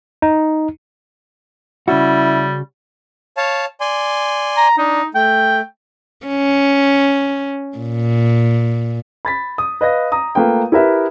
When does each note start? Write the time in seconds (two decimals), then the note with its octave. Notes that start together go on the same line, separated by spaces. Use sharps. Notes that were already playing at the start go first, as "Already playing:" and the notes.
0.22 D#4
1.88 C#3 G3 C#4 E4 F#4
3.37 C#5 F5 A5
3.81 D5 G#5 C6
4.57 A#5
4.78 D4 D#4
5.15 A3 G5
6.26 C#4
7.78 A#2
9.25 B5 A6 B6
9.58 D#6
9.81 B4 D#5 F5 A#6
10.12 A#5 D#6
10.35 A3 A#3 F4 B4 G5
10.72 E4 G4 A#4 B4 E5